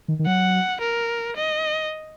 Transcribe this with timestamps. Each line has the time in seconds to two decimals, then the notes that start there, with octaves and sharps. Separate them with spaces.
0.08 D#3
0.19 D#3
0.26 F#3 F#5
0.81 A#4
1.36 D#5